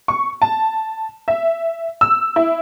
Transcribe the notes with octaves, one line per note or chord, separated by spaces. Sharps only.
C#6
A5
E5
E6
E4